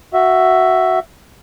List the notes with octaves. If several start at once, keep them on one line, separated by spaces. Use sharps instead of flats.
F#4 E5